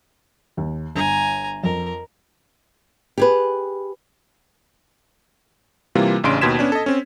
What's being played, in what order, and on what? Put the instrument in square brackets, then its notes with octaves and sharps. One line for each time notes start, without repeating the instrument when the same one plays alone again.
[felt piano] D#2
[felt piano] G1 [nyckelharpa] G#5 A#5
[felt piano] F2 [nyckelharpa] A#4
[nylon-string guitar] G4 G#4 B4
[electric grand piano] C3 E3 G3 A#3 E4 F4
A1 C#3 D4 C6 D7
D#2 B2 C6 G#6 B6 E7
B3 C#4 D4
A4 D#5
C4 C#4